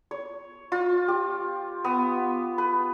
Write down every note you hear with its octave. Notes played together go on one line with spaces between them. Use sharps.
C#5
F4
G4
B3
B4